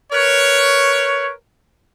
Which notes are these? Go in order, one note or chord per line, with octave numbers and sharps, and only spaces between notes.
A#4 B4 C#5